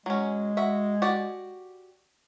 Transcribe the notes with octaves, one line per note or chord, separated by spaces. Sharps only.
F#3 G#3 C#4
F#4 E5
F#4 G4 D5